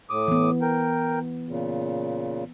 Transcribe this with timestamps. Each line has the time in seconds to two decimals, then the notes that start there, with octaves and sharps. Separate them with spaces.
0.10 A2 D6 D#6
0.28 E3 B3
0.62 A#4 G5
1.48 A#2 C#3